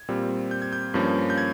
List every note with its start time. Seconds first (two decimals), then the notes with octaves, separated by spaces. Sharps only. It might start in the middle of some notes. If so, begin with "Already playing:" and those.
Already playing: G#6
0.09 A#2 G3 C4
0.51 G6
0.62 G#6
0.73 G6
0.94 G2 F3 A#3 C#4
1.30 G6
1.38 G#6